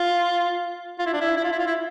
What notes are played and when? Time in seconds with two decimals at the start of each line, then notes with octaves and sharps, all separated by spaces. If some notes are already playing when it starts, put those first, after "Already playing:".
Already playing: F4
0.99 F4
1.07 E4
1.13 D4
1.21 E4
1.37 E4
1.44 F4
1.52 E4
1.59 F4
1.67 E4